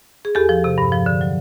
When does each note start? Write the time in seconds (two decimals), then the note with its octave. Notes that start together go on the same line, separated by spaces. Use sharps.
0.25 G#4
0.35 E2 G4 A4
0.49 F3
0.64 C3
0.78 G2
0.92 F3
1.06 D3
1.21 F#3